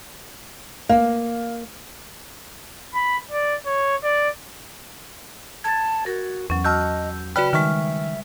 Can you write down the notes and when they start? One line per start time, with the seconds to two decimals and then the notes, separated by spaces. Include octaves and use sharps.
0.89 A#3 F5
2.94 B5
3.31 D5
3.66 C#5
4.04 D5
5.64 A5 G#6 A6
6.06 F#4 A#4
6.50 E2 F#3 C#4
6.64 F#4 D#5 A5 E6 F6 G6
7.36 C#3 F#4 B4 D5 G5 B5 F#6
7.53 D#3 G3 G#3 E5 C#6 F6